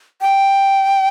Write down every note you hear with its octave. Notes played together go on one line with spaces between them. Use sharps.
G5